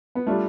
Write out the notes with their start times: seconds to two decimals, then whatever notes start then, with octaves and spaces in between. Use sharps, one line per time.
0.15 B3
0.27 G3 A3 D4 F4